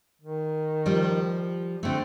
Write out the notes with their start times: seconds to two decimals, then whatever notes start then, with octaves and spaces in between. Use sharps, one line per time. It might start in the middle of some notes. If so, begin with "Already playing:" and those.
0.22 D#3
0.86 F3 G3
1.83 D3 A3 C4